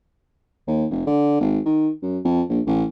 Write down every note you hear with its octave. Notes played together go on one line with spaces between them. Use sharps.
D#2
F1
D3
G#1
D#3
F#2
F2
A#1
A1